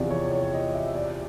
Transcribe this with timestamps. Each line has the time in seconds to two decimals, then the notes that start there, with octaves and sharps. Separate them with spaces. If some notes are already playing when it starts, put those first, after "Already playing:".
Already playing: E2 C3 F3 D5
0.11 C#5
0.32 C#5
0.54 D#5
0.74 E5
0.95 D5